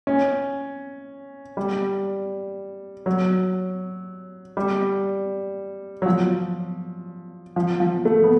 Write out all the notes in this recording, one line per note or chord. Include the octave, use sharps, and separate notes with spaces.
C#4
G3
F#3
G3
F#3
F3
F3
F3
A3
B3